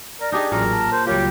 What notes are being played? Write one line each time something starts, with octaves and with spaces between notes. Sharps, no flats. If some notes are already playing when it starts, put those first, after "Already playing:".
A#4 D5
D4 D#4 G4 G#4
A1 A#2 F#3 C#4 G#4 A#4
A5
A#4 C5
C#2 F#3 G3 F4 G4 A#4 C#5